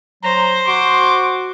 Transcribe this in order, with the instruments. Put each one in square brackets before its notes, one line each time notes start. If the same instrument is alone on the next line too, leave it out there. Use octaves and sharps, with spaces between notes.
[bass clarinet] F#3 [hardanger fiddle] C5 [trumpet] A#5
[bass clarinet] F#4 [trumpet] C6 [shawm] D6